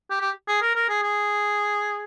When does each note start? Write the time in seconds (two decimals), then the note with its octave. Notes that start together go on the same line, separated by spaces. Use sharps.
0.10 G4
0.20 G4
0.48 G#4
0.62 A#4
0.75 A#4
0.89 G#4
1.03 G#4